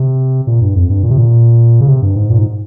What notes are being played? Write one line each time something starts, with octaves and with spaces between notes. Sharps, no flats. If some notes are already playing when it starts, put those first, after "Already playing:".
Already playing: C3
A#2
G2
F2
G2
A#2
C3
A#2
C#3
C3
G2
G#2
A#2
G#2